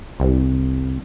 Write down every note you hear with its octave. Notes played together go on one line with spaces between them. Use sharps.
C2